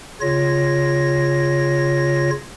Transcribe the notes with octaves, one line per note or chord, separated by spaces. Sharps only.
C#3 F4 C#5 A#6